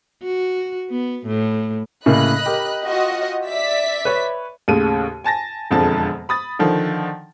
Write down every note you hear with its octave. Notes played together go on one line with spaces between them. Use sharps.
F#4
B3
A2
A2 C#3 A#3 D#5 B5 F#6
G4 A#4
F4 F#4 D#5
D5 E5 B6
B4 C#5
D#2 A2 C#3 D#7
G#5 A5 A6 A#6
E1 F2 D3 F3 G#3 A5
B5 D#6 A6
D3 D#3 F3